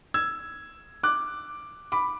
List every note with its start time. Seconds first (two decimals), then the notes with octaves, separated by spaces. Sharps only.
0.14 E6 G#6
1.03 D6 F#6
1.92 B5 D6